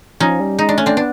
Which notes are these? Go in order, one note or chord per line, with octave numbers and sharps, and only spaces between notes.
F3 C#4 D#4
G3
G#3 D#4
D4
A3 C#4
C4 D4
B3 D4